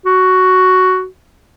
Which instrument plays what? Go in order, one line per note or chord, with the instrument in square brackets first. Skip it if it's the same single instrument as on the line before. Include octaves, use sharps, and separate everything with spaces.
[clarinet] F#4